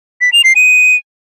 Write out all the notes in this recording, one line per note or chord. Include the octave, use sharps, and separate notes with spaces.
B6
F7
C7
D#7